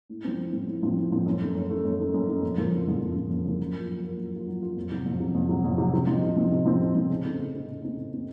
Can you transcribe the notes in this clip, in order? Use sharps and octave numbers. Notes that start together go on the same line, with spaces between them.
A2
F3 C4
A2
F3 C4
A2
F3 C4
A2
F3 C4
F#2
D#3 A3
F#2
D#3 A3
F#2
D#3 A3
F#2
D#3 A3
F2
C#3 F3 A#3
F2
C#3 F3 A#3
F2
C#3 F3 A#3
F2
C#3 F3 A#3
F#3
A#3 F4
F#3
A#3 F4
F#3
A#3 F4
F#3
A#3 F4
F2
C3 F#3
F2
C3 F#3
F2
C3 F#3
F2
C3 F#3
C3
F3 C4 D#4
C3
F3 C4 D#4
C3
F3 C4 D#4
C3
F3 C4 D#4
C#3
A3 C4 D#4
C#3
A3 C4 D#4
C#3
A3 C4 D#4
C#3
A3 C4 D#4